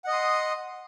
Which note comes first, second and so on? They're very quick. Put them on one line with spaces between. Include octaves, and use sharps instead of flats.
F#5 D#5 D#6 C6